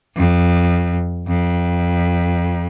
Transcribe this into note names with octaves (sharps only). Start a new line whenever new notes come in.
F2
F2